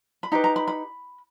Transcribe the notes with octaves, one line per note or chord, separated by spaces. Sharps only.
B5
D#4 G4 B4 A#5
A#5
B5
B5